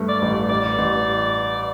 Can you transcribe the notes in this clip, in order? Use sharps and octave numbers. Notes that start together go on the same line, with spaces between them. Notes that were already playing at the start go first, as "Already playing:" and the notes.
Already playing: G2 A3
D5
A1
A1 D5
A1